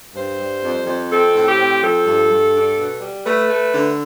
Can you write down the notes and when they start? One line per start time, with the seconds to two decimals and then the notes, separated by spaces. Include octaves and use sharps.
0.14 G2 C5
0.38 G3
0.62 F2
0.86 F2
1.10 C4 A4
1.34 A2
1.46 G4
1.57 C4
1.81 F3 A4
2.05 G2
2.29 G2
2.54 D4
2.77 B2
3.00 G3
3.25 A3 B4
3.49 A3
3.73 D3